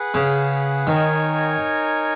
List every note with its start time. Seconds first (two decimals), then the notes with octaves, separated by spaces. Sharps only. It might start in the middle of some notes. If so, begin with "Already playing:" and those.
Already playing: G#4 B4 F#5
0.14 C#3
0.87 D#3 D#4 A#4 C#5 G#5